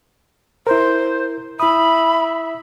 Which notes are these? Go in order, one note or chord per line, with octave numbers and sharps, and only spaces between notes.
E4 A#4 C5
E4 E5 B5 D#6